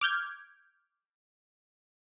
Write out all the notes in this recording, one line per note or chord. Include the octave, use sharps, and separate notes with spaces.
D6 F6 G6 G#6